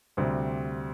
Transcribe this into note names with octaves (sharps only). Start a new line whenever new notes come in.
D2 C3 G3 C4